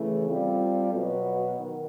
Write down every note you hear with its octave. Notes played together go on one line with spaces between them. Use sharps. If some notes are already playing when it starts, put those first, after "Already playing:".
Already playing: C#3 E3 A3
G3 C4 F4 A4
B2 F#3 B3
D#3